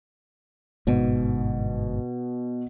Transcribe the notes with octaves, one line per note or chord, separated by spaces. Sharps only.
G1 G#2 B2